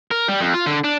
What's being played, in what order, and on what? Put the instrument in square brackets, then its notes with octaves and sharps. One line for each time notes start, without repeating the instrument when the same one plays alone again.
[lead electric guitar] A#4
G3
F2
F4
D3
D4